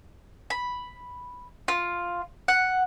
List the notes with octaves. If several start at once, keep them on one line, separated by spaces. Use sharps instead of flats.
B5
F4
F#5